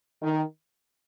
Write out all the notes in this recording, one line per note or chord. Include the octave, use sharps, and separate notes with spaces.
D#3